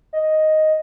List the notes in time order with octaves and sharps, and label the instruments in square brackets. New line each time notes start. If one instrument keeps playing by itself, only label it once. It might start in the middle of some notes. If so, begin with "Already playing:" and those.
[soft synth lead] D#5